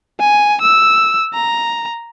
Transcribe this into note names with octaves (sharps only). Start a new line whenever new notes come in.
G#5
E6
A#5